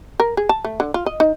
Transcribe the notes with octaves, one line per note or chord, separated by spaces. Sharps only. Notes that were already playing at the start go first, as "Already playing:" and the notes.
A#4
G#4
A5
A3
D3
F4
D#5
D#4